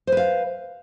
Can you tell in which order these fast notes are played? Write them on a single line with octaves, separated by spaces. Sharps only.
C5 B4 F5